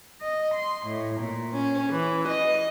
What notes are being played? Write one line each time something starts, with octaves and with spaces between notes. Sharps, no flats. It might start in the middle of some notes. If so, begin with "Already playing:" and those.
D#5
C6
A2
A#2
C#4
E3
D#5